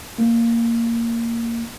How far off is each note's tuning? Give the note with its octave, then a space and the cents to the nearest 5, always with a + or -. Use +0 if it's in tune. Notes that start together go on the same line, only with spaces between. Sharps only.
A#3 -10